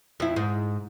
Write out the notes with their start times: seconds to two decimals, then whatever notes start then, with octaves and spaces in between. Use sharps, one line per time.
0.20 F2 E4
0.36 G#2